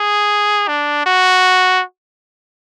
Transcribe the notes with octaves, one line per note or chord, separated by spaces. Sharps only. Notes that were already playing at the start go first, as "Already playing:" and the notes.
Already playing: G#4
D4
F#4